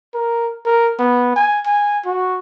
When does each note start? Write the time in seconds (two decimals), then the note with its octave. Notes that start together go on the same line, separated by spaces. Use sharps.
0.14 A#4
0.66 A#4
0.99 B3
1.36 G#5
1.66 G#5
2.06 F#4